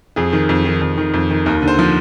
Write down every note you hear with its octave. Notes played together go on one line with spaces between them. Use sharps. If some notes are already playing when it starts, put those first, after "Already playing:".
F2 G#4
D#3
F2
D#3
F2
D#3
F2
D#3
D#2 A#4
D3
C5
F3